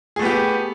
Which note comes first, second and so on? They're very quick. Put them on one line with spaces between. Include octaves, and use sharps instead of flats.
G#4 A3 B3 G4